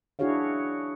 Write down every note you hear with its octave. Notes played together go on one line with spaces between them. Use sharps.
D4 E4 F#4 G#4 C#5 F5